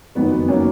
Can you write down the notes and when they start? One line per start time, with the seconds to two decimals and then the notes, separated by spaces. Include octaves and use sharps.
0.15 F#1 F2 D#3 F#3 B3
0.32 B3
0.48 D#3 F#3 A#3 C#4